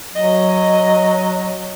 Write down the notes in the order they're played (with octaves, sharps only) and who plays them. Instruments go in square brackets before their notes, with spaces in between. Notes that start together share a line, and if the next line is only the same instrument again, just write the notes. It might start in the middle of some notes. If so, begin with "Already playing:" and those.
[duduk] F#3 [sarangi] D#5